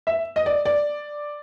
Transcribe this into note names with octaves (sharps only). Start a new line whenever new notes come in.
E5
D#5
D5
D5